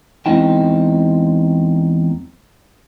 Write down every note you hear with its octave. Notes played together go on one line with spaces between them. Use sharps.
E2 G#3 C4 D#4 E4 G5